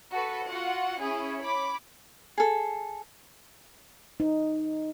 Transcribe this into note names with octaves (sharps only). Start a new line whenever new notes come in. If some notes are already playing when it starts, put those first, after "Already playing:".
F#4 A4 B4
F4 F#4 F#5
C#4 E4 G#4
C#5 B5 D6
G#4 A4
D#4